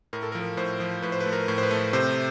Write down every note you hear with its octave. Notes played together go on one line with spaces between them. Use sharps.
A2 A#4
A4
F3 A#4
A2 C5
F3
A2 B4
C5
B4
A3
A#4
A2
C5
B4
A3
C3 C5